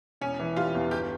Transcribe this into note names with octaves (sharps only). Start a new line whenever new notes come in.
E1 C#4
E3
G3 F4
E2
G1 G4